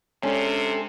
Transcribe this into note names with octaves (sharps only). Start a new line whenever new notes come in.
C3 G#3 C#4 D4 A4 C6